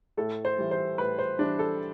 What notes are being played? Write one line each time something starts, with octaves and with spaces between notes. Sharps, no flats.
A2 A4
C5
E3 G3
C5
A2 B4
C5
E3 G3 D4
A4